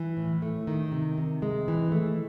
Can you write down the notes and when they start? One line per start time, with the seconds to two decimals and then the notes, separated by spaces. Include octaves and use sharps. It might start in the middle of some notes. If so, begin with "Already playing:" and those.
Already playing: E3
0.17 A2
0.42 A3
0.67 D#3
0.92 C3
1.18 C3
1.42 G#3
1.68 E3
1.92 A3